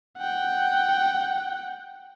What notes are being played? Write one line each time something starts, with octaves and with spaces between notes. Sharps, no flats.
F#5 G5